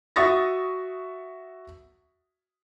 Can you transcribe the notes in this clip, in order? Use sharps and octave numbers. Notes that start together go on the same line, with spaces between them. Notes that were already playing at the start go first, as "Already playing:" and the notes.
F#4 E5 C#6 D#6 A6 A#6